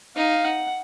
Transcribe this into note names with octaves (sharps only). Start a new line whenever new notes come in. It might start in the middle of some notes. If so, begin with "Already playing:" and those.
D#4 F5
F#5